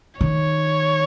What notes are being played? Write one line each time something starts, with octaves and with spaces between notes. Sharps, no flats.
D#3 C#5